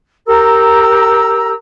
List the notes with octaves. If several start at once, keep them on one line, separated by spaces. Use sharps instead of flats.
G4 A#4 A#5 E6